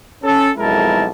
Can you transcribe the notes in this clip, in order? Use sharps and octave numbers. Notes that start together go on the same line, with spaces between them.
C#4 A4
B1 F2 G#3 E4 A#4 A5